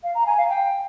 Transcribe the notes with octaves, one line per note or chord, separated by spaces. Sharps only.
F5
A#5
G#5
F5
G5